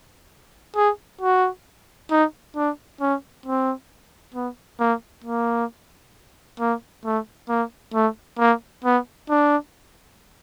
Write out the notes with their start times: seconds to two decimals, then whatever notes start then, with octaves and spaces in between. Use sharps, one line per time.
0.76 G#4
1.21 F#4
2.10 D#4
2.56 D4
3.01 C#4
3.46 C4
4.34 B3
4.79 A#3
5.24 A#3
6.60 A#3
7.05 A3
7.49 A#3
7.94 A3
8.39 A#3
8.84 B3
9.30 D4